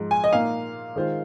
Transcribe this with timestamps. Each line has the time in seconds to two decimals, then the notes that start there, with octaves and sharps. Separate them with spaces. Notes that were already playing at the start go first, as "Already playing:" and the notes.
Already playing: G#2 F3 G#3 D#4
0.11 G#5
0.24 D#5
0.32 A#2 A#3 D#4 F5
0.96 D#3 G#3 F4 C5